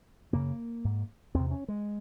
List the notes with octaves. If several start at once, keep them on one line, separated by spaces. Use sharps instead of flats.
F#2 C#3 A#3
G#2
E2 C3 C4
C#4
G#3